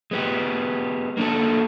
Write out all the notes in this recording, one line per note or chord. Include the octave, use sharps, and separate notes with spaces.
G#3 B3 G4
A#3 D4 E4 F#4 A4